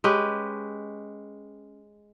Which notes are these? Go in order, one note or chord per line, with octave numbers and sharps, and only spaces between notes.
G#3 C#4 G4 B4